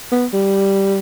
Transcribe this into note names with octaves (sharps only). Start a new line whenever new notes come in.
B3
G3